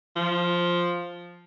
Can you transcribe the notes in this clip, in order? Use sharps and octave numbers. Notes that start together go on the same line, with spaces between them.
F3